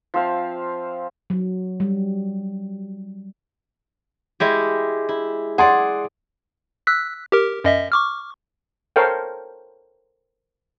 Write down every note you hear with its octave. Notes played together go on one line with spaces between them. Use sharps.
F3 C4 E5 F5
F#3
G3
G#3 E4 G4
E4
G#4 D5 F#5 C6
E6 F#6 B6
G4 A#4
F#2 D#5 E5
C#6 D6 F6
A4 A#4 C5 C#5 F5 G5